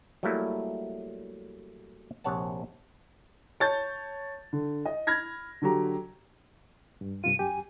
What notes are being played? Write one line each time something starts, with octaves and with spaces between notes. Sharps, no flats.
F#3 G3 A3 A#3 E4
A#1 C3 C#5 F#5 A5
C#5 A5 G6 A6
D3
D#5
B5 F6 G#6 A#6
D3 F#3 G4 A#5
G2
G2 C3 F4 D#7
F#2 G4 G#5